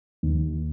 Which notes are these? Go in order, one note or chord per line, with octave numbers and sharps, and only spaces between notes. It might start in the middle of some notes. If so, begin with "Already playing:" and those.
D#2